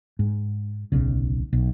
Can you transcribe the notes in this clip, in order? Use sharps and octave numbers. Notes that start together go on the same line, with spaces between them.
G#2
D1 B1 C#3
B1